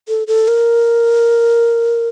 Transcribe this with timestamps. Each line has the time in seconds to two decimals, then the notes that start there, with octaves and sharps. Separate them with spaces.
0.08 A4
0.27 A4
0.48 A#4